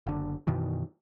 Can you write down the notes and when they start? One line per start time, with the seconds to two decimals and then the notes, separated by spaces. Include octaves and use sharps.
0.07 F#1 D3
0.47 F#2 B2 D#3 E3